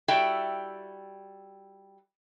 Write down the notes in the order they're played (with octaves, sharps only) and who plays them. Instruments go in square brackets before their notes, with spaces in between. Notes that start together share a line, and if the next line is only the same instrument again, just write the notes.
[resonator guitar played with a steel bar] G3 E4 F#4 A4 E5 G5